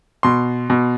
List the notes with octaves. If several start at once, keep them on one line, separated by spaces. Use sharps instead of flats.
B2 C6
B2